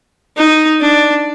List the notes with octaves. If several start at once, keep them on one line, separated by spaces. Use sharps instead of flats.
D#4
D4